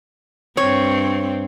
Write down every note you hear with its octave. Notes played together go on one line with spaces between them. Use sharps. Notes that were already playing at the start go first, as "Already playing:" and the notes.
G2 C4 C#5